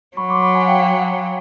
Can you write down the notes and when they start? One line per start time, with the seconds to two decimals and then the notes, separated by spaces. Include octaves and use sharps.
0.17 F#3 B5 C#6
0.29 C6 D6
0.42 B5 C#6
0.55 F#5 G#5
0.68 F5 G5